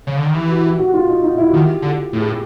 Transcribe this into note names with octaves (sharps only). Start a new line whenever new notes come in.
C#3
D3
D#3
E3 G4
F#4
G4
F#4
F4
D#4
D#4
E4
F#4
D#3 G4
D3
A2
G#4
G4